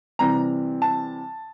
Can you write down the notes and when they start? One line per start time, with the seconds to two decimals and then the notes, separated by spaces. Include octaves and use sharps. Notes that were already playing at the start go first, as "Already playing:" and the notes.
0.19 C3 E3 G3 C4 A#5
0.82 A5